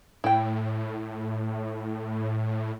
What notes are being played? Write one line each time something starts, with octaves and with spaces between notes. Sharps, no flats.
A2 E4 G5